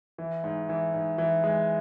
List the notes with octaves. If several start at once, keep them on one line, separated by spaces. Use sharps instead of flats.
E3
G#2
E3
G#2
E3
G#3